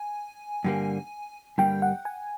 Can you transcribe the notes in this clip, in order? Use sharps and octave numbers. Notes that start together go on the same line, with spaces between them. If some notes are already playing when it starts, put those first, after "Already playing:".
Already playing: G#5
G2 D3 G3 A#3
G2 D3 G3 A#3 G5
F#5
G#5